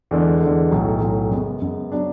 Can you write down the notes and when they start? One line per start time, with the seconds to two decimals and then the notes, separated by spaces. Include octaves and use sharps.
0.11 E2 D3 G#3
0.41 E2 D3 G#3
0.71 B1 A2 F#3
1.02 B1 A2 F#3
1.31 F#2 C#3 G#3 B3
1.62 F#2 C#3 G#3 B3
1.92 F#3 B3 D4